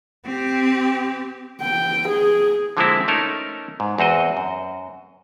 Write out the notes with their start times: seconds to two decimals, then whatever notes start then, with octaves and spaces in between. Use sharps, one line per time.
0.25 C4 G4
1.62 G5
2.09 G#4
2.77 D3 F3 G#3 A#3 C4 E4
3.08 A3 C#4 D#4 A4 A#4
3.80 G#2
3.98 E2 C4 F#4 D#5
4.37 F#2